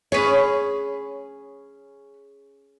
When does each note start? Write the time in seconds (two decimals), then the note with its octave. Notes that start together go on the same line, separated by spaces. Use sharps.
0.12 C#4 G#4 B4 C#5